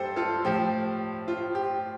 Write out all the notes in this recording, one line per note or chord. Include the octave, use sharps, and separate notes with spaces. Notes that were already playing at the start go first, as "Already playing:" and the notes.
Already playing: G2 G4 A4 C5
F4 A4
A2 F3 G4
F4
G4